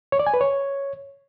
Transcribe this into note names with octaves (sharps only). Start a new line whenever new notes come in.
C#5
D5
G#5
B4
C#5